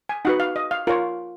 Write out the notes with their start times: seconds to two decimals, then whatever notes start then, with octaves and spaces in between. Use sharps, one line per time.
0.09 G#5
0.25 D#4 F#4 B4 F#5
0.40 F5
0.56 D#5
0.71 F5
0.87 F4 A#4 C#5